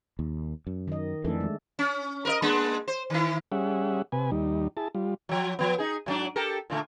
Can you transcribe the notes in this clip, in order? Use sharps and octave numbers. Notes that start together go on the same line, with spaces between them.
D#2
F#2
D#3 D#5
F2 E3 A3 D4 A4
G#3
C#4
A#4 B4 D#5
G#3 A#3 D4
C5
D#3 E4
G3 C#4 G#4 E5 F#5
C3 B4 G#5
D#2 G3 D#4
E4 G#4 A5
G3 F4
F3 F#3
F3 B3
D#4 G#4
G#2 F#3 D4
G4 A4 A#4
A#2 D3 A3